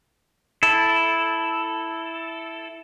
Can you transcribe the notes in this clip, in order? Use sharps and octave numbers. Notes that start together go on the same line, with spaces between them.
E4 A4